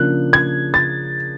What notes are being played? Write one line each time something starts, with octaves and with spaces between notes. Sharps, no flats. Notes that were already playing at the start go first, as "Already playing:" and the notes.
Already playing: C#3 F3 A#3 D4 F#6
G#6
A6